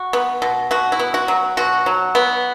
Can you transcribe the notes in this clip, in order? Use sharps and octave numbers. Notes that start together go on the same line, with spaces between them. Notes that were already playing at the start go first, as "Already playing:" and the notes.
Already playing: F#4
B3
B2
B2 F#4
E4
B3
F#4
F#3
B2 F#4
F#3
B3